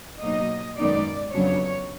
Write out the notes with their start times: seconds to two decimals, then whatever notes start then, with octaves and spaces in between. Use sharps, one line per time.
0.22 B2 F#3 A#3 D#4 D#5
0.78 F#2 D#3 G#3 B3 D#4 D5
1.33 F2 C#3 F#3 B3 D4 C#5